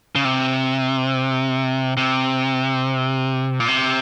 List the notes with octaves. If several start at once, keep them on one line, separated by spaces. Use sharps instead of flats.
C#3
C3
C3
A#2
C3